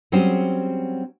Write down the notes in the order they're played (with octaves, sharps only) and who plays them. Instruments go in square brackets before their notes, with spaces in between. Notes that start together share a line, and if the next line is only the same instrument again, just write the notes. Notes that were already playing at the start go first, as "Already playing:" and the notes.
[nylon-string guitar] F#3 G3 C4 C#4 G#4 C5